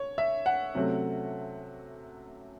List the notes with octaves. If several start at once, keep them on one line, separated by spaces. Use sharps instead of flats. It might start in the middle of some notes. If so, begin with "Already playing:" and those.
Already playing: C#5
E5
F#5
C3 F#3 A3 C#4